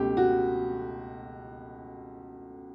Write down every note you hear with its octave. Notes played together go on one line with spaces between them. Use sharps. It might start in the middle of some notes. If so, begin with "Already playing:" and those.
Already playing: C#2 B2 A3 G4
F#4